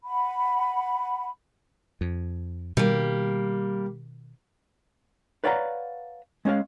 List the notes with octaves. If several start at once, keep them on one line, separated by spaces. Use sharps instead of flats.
F#5 B5
F2
B2 D#3 G3 A#3
B4 C#5 D5 F5 F#5 A#5
G#3 C#4 C#5 F5